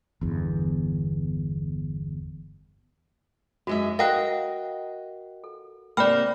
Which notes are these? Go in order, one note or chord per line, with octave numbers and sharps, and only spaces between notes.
G1 E2
F#2 G#3 F#4 E5
F#4 A#4 B4 D#5 F5 G5 F#6
A4
C3 A#3 D5 G5 B5 F6